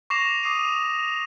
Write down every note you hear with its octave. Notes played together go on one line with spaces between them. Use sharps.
C#6 D6 A#6 C7 E7 F7
D6 D#6 C7 D#7